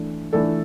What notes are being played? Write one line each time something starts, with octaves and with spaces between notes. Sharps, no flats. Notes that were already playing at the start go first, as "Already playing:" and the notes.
Already playing: E3 A3 D4
E3 A3 D4 A4 D5